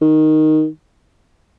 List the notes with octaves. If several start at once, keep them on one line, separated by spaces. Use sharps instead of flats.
D#3